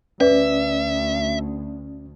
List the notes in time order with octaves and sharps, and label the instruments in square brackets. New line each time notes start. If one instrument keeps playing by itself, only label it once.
[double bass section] D2 [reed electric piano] C#4 D5 [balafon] B4 [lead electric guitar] E5